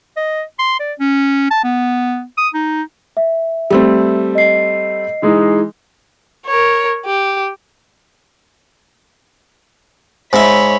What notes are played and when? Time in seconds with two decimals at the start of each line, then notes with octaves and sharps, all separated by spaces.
0.17 D#5
0.59 C6
0.80 D5
0.99 C#4
1.51 A5
1.64 B3
2.38 D#6
2.54 D#4
3.17 E5
3.70 G3 A3 C4
4.35 D#5 C7
5.22 E3 G#3 D#4
6.46 A#4 C#5
7.05 G4
10.33 G#2 C#5 E5 B5